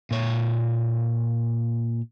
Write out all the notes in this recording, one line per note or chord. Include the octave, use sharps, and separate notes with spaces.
A#2 C#5